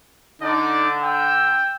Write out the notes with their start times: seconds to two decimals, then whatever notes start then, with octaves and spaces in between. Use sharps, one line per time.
0.42 D3 D#4 D5
1.03 G5 E6